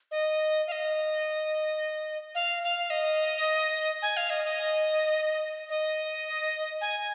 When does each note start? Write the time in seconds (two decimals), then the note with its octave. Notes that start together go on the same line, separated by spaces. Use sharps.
0.11 D#5
0.67 F5
0.72 D#5
2.35 F5
2.63 F5
2.90 D#5
4.02 G#5
4.17 F5
4.30 D#5
4.44 D#5
5.70 D#5
6.81 G#5